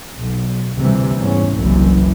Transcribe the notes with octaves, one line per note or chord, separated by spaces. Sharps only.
B1
D2 C3 E3 G3
E2 G#2 C#4
F#1 C2 F#2 E3